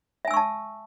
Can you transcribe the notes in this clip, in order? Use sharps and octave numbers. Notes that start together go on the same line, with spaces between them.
E5 G#5 A5 C#6 E6